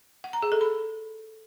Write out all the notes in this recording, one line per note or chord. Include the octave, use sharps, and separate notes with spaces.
F#5
A#5
G#4
A4
B5